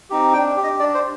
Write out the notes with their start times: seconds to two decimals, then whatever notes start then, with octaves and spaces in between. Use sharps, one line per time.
0.10 C4 D#4 G4
0.33 D4 G5
0.57 G4
0.64 D#5
0.79 D4 D5
0.94 C5